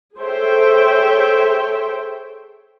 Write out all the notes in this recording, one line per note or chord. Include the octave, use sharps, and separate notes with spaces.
G#4 A4 C5 C#5 E5 G5